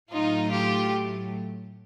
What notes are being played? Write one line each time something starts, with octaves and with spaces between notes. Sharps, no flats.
A2 F#3 A3 D#4 F4
F4 G4